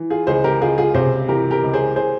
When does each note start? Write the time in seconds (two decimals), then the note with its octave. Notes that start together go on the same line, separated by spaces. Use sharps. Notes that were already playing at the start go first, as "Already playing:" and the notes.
Already playing: E3
0.10 F4 G#4
0.27 C#2 G#4 C5
0.44 G4 A#4
0.61 C#2 F4 G#4
0.78 F4 G#4
0.94 C3 G#4 C5
1.28 E3 G4 A#4
1.51 G4 A#4
1.63 C#2
1.73 G#4 C5
1.96 G#4 C5